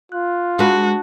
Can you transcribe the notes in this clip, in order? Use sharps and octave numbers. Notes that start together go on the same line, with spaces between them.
F4 F#6
G#3 D4 F#4 B4 A5 F#6